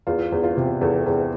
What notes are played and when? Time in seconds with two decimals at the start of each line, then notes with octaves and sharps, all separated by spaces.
0.07 E2 F4
0.32 E2
0.44 F4
0.57 C3
0.81 E2 A4
1.06 E2